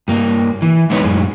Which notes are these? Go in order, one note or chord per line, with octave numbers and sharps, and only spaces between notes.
G2 A#3
E3
G#3 B3 D#4 B4 C#5
F#2 A2 G#3